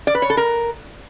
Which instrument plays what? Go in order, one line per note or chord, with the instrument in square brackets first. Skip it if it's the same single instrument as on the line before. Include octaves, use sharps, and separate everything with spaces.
[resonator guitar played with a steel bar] D5
B4
C#5
A4
A#4